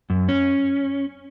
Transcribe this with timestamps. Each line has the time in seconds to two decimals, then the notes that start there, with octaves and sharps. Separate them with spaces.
0.10 F#2
0.29 C#4